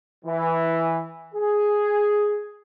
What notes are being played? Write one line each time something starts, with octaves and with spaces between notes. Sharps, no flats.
E3
G#4